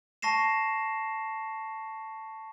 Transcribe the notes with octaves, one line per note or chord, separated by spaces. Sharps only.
A5 C#6 A#6 C7 E7